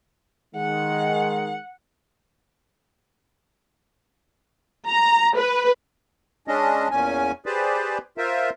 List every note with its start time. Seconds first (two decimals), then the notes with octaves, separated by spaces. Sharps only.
0.55 D#3 G#3 F#5
4.89 A#5
5.37 B4
6.48 G#3 C#4 D4 D#5
6.91 E2 A#2 C#4 G#5
7.46 G4 G#4 B4 C5 D5
8.18 F4 A#4 C5 E5